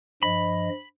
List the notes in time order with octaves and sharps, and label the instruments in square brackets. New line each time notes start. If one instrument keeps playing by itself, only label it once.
[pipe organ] G2 F3 D#5 [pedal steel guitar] B5